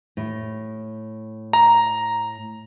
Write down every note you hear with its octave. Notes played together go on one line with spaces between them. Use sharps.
A2
A#5